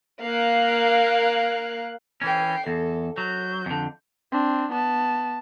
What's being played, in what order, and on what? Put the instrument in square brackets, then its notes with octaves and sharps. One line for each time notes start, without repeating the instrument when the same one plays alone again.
[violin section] A#3 F5 F#6
[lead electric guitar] E3 C#4 [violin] G5 C7
[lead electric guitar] E2 [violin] A4
[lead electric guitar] F#3 [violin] G6
[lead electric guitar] F2 D3
[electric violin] C4 D4
B3 A5